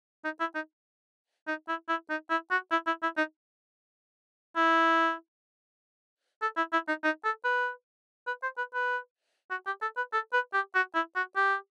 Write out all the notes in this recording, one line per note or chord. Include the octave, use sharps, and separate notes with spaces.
D#4
E4
D#4
D#4
E4
E4
D#4
E4
F#4
E4
E4
E4
D#4
E4
A4
E4
E4
D#4
D#4
A4
B4
B4
C5
B4
B4
F#4
G4
A4
B4
A4
B4
G4
F#4
E4
F#4
G4